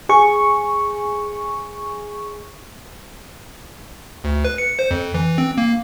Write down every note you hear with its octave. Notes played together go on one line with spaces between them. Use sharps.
G#4 C#6
D2
B4
C#7
C5
F2
E3
C4
A#3